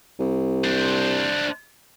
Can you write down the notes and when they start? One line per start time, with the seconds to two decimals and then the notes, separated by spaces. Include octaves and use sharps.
0.19 C2
0.64 D4 C5